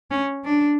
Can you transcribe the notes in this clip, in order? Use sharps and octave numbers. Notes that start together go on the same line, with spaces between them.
C#4
D4